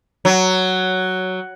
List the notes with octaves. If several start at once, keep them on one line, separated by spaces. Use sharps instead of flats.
F#3